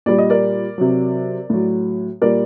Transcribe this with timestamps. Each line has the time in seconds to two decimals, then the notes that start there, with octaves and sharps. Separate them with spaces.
0.06 A#2 G3 D5
0.18 D#5
0.30 A#4 D5
0.78 C3 F#3
1.50 A2 F#3
2.22 A#2 G3 A#4 D5